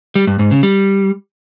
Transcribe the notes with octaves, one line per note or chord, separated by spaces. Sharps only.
G3
G2
G#2
C#3
G3